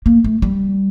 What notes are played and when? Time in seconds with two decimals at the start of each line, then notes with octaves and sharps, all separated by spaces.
0.06 A#3
0.24 A3
0.42 G3